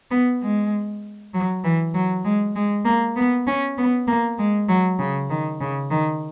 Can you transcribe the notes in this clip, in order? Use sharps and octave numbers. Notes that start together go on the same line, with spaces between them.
B3
G#3
F#3
E3
F#3
G#3
G#3
A#3
B3
C#4
B3
A#3
G#3
F#3
C#3
D#3
C#3
D#3